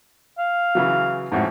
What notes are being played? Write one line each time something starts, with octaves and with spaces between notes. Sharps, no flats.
F5
C#3 E3 F#3
A1 F2 G#2 F#4